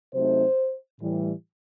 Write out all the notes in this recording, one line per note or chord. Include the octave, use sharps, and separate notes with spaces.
C3 F#3 A3 C4 D#4 C5
A2 E3 G3